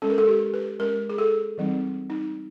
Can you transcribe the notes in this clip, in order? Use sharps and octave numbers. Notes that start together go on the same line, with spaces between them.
G#3 C#4 A4
A#4
A4
G4
B4
G#3 C#4 A#4
G#4
A4
E3 G3 C4 D#4
D#4